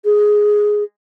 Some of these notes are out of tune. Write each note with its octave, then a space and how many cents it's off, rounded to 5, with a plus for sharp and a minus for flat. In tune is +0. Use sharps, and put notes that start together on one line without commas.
G#4 +5